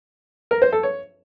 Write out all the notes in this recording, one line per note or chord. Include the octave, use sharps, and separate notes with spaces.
A#4
C5
A4
C#5